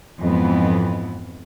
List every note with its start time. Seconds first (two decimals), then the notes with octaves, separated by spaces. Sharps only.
0.20 F2 G#2 E3 B3